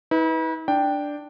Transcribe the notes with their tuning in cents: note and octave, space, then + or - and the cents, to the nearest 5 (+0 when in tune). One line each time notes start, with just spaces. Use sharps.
E4 -45 B4 +0
D4 +0 G5 +0